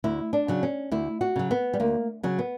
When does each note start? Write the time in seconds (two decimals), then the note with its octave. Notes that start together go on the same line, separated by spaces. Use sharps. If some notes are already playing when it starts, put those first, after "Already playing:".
0.04 D2 E4
0.33 D4
0.48 C#3 F#3
0.63 C#4
0.92 D2 E4
1.21 F#4
1.36 C#3 F#3
1.51 B3
1.74 G3
1.80 D2 A#3
2.23 C#3 F#3
2.39 B3